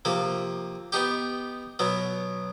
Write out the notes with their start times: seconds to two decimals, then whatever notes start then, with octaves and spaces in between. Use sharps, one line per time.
0.05 C3 F3 A#3
0.92 B3 D#4 G4
1.79 B2 F#3 B3